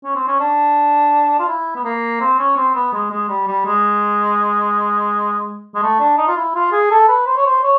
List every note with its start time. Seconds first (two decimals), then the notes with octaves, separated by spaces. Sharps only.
0.04 C#4
0.16 C4
0.28 C#4
0.40 D4
1.39 F4
1.48 E4
1.75 B3
1.84 A#3
2.21 C4
2.39 C#4
2.57 C4
2.75 B3
2.93 G#3
3.11 G#3
3.29 G3
3.47 G3
3.66 G#3
5.75 G#3
5.83 A3
6.00 D4
6.18 D#4
6.28 F4
6.37 E4
6.55 F4
6.73 G#4
6.91 A4
7.08 B4
7.27 C5
7.37 C#5
7.46 C5
7.63 C#5